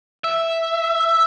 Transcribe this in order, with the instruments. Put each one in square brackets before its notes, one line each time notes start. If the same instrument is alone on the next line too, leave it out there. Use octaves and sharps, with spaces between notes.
[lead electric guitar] E5